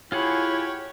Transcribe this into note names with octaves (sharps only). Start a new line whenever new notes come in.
E4 F4 G4 G#4 C#5 F#5